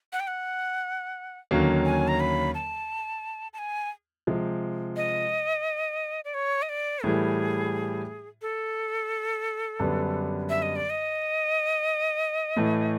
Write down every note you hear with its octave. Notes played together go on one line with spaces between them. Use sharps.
F#5
G5
F#5
D#2 D3 F#3 A#3 C#4
G#5
A#5
B5
A5
A5
G#5
C3 F3 G#3
D#5
D5
C#5
D#5
D5
A2 E3 G3 G#4
A4
F#2 D3 G3 B3 D4
E5
D#5
D5
D#5
A2 E3 A3